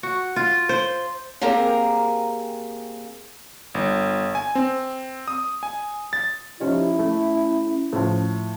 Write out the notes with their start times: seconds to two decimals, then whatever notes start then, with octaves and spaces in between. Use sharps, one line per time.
0.03 F#4
0.36 F4
0.69 C5
1.41 A#3 C4 G4 G#4 A#4 A#5
3.75 G1
4.35 G#5
4.55 C4
5.28 D#6
5.63 G#5
6.13 A6
6.60 F3 C#4 D#4 E4 G4
6.99 A3 C#4
7.93 A2 F3